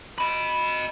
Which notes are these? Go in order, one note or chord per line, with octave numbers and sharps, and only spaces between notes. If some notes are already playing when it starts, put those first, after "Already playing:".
D#5 B5